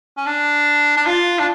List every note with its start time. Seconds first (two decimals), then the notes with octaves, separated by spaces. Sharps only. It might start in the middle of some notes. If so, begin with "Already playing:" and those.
0.17 C#4
0.26 D4
0.97 D4
1.06 F4
1.39 D4